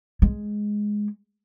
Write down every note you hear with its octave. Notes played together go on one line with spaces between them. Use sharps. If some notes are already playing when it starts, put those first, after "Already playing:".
G#3